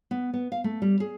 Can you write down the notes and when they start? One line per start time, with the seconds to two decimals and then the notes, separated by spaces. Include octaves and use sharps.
0.11 B3
0.34 B3
0.52 F5
0.64 A3
0.82 G3
1.00 G#4